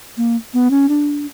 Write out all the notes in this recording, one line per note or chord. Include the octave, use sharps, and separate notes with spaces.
A#3
B3
C#4
D4